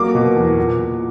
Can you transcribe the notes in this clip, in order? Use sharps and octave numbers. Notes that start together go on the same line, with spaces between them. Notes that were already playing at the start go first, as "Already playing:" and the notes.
Already playing: F#3 A#3 D6
B2
E2
A#2
A#2